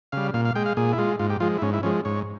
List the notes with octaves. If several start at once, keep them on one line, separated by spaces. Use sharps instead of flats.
C#3 G3 F5
A#2 F5
F5
G#3 G5
F5
A#2 G#4
E4
G#3 F4
G#2 F4
G4
F3 G#3 F4
E4
G#2 C#4
E4
F3 G#3 C#4
G#2 C#5